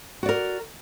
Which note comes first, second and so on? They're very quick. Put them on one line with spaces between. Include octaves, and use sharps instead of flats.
F#4 D5 A#4